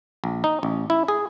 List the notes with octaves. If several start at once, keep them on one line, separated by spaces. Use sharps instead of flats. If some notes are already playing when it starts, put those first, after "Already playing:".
A#1
D#4
A1
E4
G#4